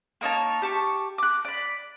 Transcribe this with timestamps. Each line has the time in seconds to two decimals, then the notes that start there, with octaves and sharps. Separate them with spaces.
0.21 A#3 D#4 C#5 A5
0.62 G4 A5 C#6
1.18 D6 F#6
1.45 D5 B5